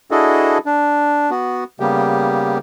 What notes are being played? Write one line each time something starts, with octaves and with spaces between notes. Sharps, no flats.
D4 E4 F#4 G#4 A4 D#5
D4
B3 F#4
C#3 G3 A#3 B3 G4